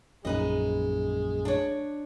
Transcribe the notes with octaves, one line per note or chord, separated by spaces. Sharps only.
A#1 F#2 G#3 D#4 B4 D#5
D4 C#5